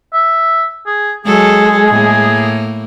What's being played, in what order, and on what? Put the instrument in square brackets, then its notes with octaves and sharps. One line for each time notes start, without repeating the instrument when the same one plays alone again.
[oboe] E5
G#4
[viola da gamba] F#3 A4 [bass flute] G#3 [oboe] G#4
[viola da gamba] A2 A#3